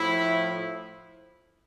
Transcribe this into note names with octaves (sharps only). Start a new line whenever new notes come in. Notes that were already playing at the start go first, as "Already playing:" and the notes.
Already playing: A2 F3 E4